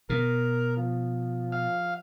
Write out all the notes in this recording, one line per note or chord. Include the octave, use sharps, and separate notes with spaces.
B2 A#4
F3
F5